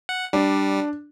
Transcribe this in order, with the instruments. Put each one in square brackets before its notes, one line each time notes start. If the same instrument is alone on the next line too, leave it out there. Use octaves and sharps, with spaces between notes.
[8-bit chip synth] F#5
[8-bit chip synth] G3 [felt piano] D4